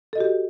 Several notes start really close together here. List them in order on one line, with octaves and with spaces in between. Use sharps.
A4 D#5 F#4 G4